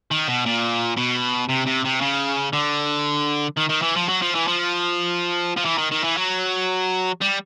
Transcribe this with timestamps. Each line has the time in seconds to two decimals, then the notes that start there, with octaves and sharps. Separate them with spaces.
0.11 D#3
0.28 B2
0.46 A#2
0.97 B2
1.49 C3
1.66 C3
1.84 C3
2.01 C#3
2.53 D3
3.57 D#3
3.70 D#3
3.82 E3
3.96 F3
4.09 F#3
4.22 F3
4.35 E3
4.48 F3
5.57 F3
5.65 E3
5.78 D#3
5.91 D#3
6.04 E3
6.17 F#3
7.21 G3